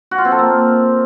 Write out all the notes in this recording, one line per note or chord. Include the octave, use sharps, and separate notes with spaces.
F#4
F4
C4
A4
A#3